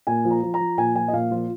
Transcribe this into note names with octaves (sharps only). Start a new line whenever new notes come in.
A#2 G#5
F3
A#5
F3
A#5
F3
A#2 G#5
F3 G#5
D#5
A#2 F5
F3 F4